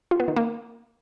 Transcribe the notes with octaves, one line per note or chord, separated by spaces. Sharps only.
F4
B3
D#3
A#3